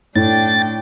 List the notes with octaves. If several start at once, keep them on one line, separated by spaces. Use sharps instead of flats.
A2 D4 G5 A6